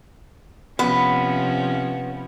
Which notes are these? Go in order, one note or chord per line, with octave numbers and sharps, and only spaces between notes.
C3 F3 B3 C#4